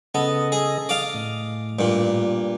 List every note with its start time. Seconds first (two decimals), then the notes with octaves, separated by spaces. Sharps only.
0.15 C#3 B3 A4 D#5
0.52 G#4
0.89 D5 D#5 F5
1.14 A2
1.79 G2 A#2